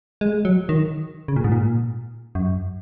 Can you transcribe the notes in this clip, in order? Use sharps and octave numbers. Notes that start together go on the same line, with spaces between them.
G#3
F#3
D#3
C#3
A#2
G#2
A#2
F#2